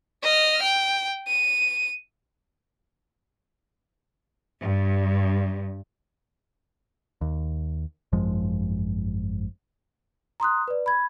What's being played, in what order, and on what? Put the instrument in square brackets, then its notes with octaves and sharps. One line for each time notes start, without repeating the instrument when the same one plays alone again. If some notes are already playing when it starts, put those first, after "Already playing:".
[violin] D#5 F6
G5
D#7
[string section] G2
[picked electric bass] D#2
G#1 F#2 F3 G#3
[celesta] A#5 C6 D#6 F#6
B4 D5
B5 G#6